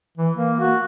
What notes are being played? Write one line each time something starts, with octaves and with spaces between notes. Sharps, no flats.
E3
A#3
F#4